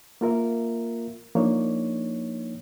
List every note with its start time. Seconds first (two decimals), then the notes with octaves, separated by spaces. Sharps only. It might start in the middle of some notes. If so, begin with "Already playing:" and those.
0.21 A#3 F4 A#4 E5
1.35 F3 A#3 D4 D#4 C#5